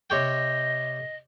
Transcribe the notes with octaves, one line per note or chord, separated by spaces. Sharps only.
C3 C#5 D#5 G5